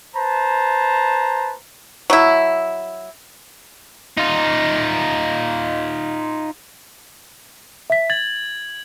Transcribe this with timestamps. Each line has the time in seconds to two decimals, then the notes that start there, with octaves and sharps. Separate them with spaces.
0.15 B4 C5 A5 A#5
2.10 F#3 E4
4.17 D#4 F4
7.90 E5 B6
8.10 G#6 A6 F#7